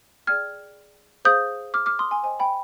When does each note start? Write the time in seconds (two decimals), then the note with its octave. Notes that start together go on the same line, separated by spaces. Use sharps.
0.27 G#4 D5 G5 F6 G#6
1.25 G#4 C5 F5 D#6 G6
1.74 D6 F6
1.86 D6 F6
1.99 C6 D#6
2.11 G#5 C6
2.23 C5 D#5 G5 G#5
2.40 G5 B5